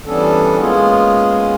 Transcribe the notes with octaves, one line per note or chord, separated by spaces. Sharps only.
E3 G3 B3 C#4 D4 A4
G#3 A#3 B3 C#4 F4 G#4